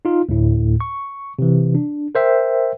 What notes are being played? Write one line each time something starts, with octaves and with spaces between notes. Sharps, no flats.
D#4 F4
D2 A2
C#6
C3 E3
D4
A#4 C5 E5 G5